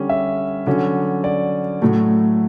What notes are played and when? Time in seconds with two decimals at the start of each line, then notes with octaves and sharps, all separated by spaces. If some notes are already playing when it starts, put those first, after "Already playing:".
Already playing: D3 G3 C#4
0.09 E5
0.66 D3 F#3 C#4
1.24 D5
1.82 A2 F#3 A3